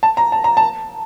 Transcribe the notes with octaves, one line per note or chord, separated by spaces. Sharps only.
A5
A#5
A5
A#5
A5